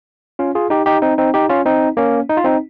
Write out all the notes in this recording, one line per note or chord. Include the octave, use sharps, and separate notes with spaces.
C#4 F4
F4 G#4
D#4 G4
D#4 G4
C4 D#4
C4 D#4
D#4 G4
C#4 F4
C4 D#4
A#3 C#4
D#4
F4
C4 D#4